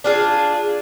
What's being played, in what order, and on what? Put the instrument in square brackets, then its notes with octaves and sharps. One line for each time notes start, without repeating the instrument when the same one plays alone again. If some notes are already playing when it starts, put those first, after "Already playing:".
[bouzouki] D4 F4 G#4